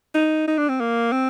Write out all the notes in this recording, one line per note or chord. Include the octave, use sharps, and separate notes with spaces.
D#4
D#4
D4
C4
A#3
C4